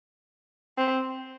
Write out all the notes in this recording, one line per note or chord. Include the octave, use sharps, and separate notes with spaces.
C4